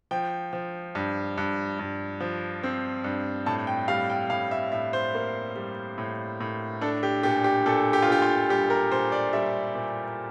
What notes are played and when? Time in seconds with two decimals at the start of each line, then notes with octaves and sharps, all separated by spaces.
0.11 F3 G5
0.53 F3
0.95 G2
1.38 G2
1.79 G2
2.20 F3
2.63 C4
3.04 G2
3.46 A2 A5
3.67 G5
3.88 G3 F5
4.10 G5
4.30 A2 F5
4.51 E5
4.72 A2 E5
4.93 C5
5.15 A#3
5.56 G3
5.98 A2
6.40 A2
6.81 D4 A4
7.03 G4
7.23 A#2 G4
7.44 G4
7.66 A#2 A4
7.93 G4
8.02 F4
8.08 A#2 G4
8.22 F4
8.49 G3 G4
8.70 A#4
8.92 A#2 C5
9.12 D5
9.33 G3 E5
9.75 A#2